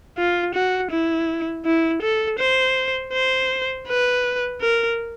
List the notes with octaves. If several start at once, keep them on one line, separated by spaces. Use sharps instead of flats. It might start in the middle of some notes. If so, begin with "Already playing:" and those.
F4
F#4
E4
E4
A4
C5
C5
B4
A#4